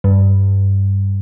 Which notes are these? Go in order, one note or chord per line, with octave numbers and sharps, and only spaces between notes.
G2